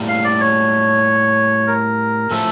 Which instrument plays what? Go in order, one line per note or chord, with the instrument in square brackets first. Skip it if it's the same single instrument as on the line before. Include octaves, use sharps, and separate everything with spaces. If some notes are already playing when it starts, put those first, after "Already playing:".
Already playing: [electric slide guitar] A2 G3 A#3
[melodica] F5
D5
C#5
A#4
[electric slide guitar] A2 F3 A3 E4 [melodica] A4